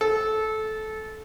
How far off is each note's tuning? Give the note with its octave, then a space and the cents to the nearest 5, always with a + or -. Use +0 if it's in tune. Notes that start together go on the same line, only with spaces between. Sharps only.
A4 -20